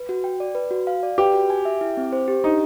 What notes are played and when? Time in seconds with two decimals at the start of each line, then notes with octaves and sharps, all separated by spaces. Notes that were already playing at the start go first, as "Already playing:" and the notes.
Already playing: B4
0.09 F#4
0.24 G5
0.40 D5
0.55 B4
0.71 F#4
0.87 F5
1.03 D5
1.18 G4 B4
1.33 F#4
1.50 G#5
1.65 E5
1.81 E4
1.97 C4
2.12 C5
2.28 G4
2.44 D4 D#4